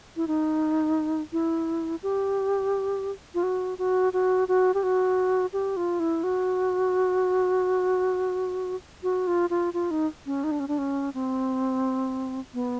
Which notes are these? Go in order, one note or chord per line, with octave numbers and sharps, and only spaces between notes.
E4
D#4
E4
G4
F4
F#4
F#4
F#4
F#4
G4
F#4
G4
F4
E4
F#4
F#4
F4
F4
F4
D#4
C#4
D#4
D4
C#4
D4
C#4
C4
B3